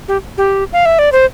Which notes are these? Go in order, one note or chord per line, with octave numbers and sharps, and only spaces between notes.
G4
G4
F5
E5
D5
C5